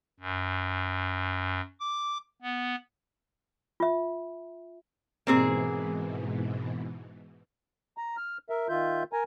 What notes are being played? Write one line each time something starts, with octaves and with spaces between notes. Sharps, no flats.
F#2
D6
B3
F4 E5
G#2 B2 E3 A#3 C4 G#4
A#5
F6
A#4 E5
D#3 F4 E5 G6
A#4 G#5 A#5